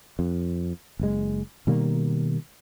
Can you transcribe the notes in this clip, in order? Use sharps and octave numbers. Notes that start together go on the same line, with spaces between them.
F2
F#1 G#3
B2 D#3 G3 A#3